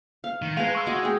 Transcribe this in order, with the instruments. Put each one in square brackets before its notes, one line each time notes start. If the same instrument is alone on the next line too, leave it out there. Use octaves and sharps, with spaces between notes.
[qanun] F5
[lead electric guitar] D#3
[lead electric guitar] G#3 [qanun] B4 A5 A#5 [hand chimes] F5 G#6
[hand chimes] C#6 E6
[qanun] F#4 D#5 D6
G4 G#4